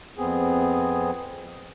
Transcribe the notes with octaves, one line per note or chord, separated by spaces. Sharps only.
F2 B3 C4 G#4